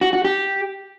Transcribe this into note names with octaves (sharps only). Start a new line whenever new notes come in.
F#4
F#4
G4